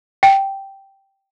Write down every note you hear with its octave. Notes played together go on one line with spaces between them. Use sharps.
G5